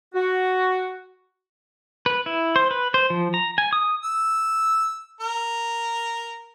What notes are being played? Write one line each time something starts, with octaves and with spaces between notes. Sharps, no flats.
F#4
B4
E4
C5
B4
C5
F3
A#5
G#5
D#6
E6
A#4